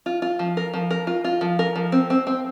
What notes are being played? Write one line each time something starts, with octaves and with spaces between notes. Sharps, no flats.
F4
F4
F3
A#4
F3
A#4
F4
F4
F3
A#4
F3
C4
C4
C4